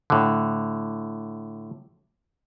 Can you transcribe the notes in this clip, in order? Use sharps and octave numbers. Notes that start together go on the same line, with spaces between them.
A2 D3